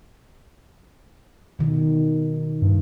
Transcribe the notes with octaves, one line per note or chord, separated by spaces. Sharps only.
B2 D#3
G2